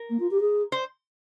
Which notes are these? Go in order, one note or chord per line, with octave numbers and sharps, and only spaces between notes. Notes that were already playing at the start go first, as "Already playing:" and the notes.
Already playing: A#4
A#3
F4
G4
G#4
C5